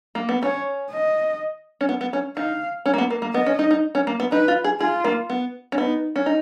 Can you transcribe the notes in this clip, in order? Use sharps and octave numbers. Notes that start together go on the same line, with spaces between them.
A#3
B3
C#4 C#5
D#5
C#4
B3
B3
C#4
D#4 F5
C#4
A#3
B3
A#3
A#3
B3 D#5
C#4
D#4
D#4
C#4
A#3
B3
D#4 B4
F4
G#4
F4 G#4
A#3
B3
C#4
B3 D#4
C#4
D#4